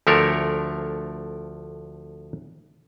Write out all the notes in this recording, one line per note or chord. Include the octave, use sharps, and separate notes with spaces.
D2 F3 A3 D4 A#4 C#5